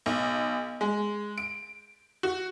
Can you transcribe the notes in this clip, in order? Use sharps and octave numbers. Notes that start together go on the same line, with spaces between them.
B1
G#3
D7
F#4